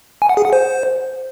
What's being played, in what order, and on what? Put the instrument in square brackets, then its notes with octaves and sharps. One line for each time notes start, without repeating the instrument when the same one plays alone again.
[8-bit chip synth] G#5
F#5
G#4
F#5
C5